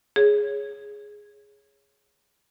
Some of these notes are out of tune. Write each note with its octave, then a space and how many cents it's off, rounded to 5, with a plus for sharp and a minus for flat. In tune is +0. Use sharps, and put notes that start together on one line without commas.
G#4 +0 C#5 +0